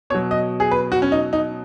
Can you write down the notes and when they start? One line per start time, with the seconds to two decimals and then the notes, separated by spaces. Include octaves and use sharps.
0.10 B2 C#5
0.15 F#3
0.31 D#5
0.60 G#4
0.71 B4
0.92 F#4
1.02 C#4
1.12 D#4
1.33 D#4